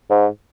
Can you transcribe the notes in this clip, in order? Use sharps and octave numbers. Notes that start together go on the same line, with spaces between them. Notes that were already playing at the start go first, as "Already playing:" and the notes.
G#2